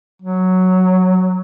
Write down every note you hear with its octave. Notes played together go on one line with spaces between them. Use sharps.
F#3